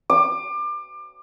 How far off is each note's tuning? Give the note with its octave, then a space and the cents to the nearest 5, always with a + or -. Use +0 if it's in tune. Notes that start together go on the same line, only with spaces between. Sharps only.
D6 +30